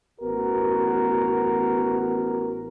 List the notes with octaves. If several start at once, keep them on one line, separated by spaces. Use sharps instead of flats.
A1 B3 F#4 A#4